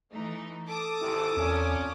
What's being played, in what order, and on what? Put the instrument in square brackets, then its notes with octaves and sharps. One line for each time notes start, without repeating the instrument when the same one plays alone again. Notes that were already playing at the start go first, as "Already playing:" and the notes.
[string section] E3 A3 D#4
[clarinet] A4 [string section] A5 D6 D#6
[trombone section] G#1 C3 [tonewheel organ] E4
[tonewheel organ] E2 C4 [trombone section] A#2 C#4